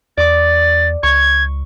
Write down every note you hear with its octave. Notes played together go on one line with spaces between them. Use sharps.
E2 D5 D6 A6
C#2 C#6 G#6